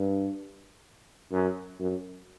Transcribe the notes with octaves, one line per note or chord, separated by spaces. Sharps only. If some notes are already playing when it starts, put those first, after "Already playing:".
Already playing: G2
F#2
F#2